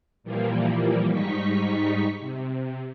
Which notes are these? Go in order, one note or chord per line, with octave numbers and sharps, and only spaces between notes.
A#2 E3 F3 G3 A#3
G#2 G3 D#4 C#6 B6
C3